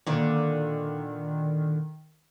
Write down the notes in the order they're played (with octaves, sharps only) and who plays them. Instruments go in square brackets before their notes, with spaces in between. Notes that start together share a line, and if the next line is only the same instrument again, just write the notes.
[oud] A#2 D3 [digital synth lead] D#3